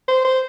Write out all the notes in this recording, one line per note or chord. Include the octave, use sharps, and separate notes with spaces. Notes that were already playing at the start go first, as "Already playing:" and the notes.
C5
C5